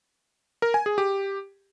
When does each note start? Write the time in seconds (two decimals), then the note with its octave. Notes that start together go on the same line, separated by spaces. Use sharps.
0.62 A#4
0.74 G#5
0.86 G#4
0.98 G4